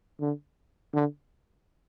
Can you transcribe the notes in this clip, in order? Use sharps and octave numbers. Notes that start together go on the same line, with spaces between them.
D3
D3